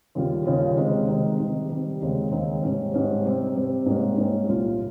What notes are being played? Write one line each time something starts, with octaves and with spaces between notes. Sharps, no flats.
D#2 C#3 G3 C#4 F4
D#2 C#3 G3 C#4 F4
C3 D#3 G#3
C3 D#3 G#3
C3 D#3 G3
C3 D#3 G3
D#2 C#3 G#3 C4 D#4
D#2 C#3 G#3 C4 D#4
G#2 G3 C#4
G#2 G3 C#4
C3 G3 C4
C3 G3 C4
G#2 G3 A#3 C#4
G#2 G3 A#3 C#4
C2 A#2 G3 C#4 F4